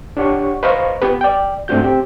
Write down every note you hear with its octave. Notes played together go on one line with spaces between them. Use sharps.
D4 G4 C#5 F#5 C#6
B4 C5 D#5 F5 A#5 C#6
B3 G4 B4
D5 G5
G#2 A3 C4 D4 F#4 G6
C4 G4